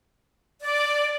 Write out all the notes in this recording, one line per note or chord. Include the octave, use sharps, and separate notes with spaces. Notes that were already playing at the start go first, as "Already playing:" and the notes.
D5